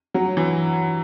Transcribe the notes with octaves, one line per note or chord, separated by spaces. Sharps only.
F#3
E3